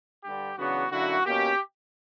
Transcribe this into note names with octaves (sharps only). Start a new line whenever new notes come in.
G2 D3 G3 G4
E2 C#3 F#3 B3 D4 F#4
F#2 D3 A#3 E4 F#4
B2 A#3 C#4 G4